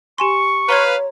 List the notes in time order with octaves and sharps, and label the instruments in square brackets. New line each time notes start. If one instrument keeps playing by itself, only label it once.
[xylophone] G4 G#5 C6 [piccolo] C#6
[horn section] B4 F5 [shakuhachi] C#5 [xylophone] A#5 C6 G#6